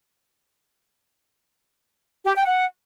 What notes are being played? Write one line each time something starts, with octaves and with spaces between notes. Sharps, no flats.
G4
G5
F#5